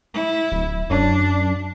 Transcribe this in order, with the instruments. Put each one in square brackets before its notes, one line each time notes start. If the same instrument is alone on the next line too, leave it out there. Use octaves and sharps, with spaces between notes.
[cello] E4
[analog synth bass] D1
[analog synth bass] F#2 [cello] D4